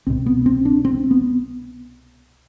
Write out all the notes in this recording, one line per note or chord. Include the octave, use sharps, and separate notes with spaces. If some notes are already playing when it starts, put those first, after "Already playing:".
C2 B2 C4
B3
C4
D4
C4
B3